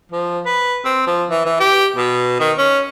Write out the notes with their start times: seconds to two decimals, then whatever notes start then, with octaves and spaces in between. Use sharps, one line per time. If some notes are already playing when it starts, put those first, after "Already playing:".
0.12 F3
0.46 B4
0.85 C4
1.07 F3
1.30 E3
1.46 E3
1.60 G4
1.96 B2
2.40 D#3
2.58 C#4